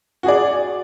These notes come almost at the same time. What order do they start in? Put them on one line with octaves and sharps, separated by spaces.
F#4 G#4 D5